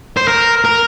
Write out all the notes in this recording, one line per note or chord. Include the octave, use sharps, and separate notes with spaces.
C5
A#4
A#4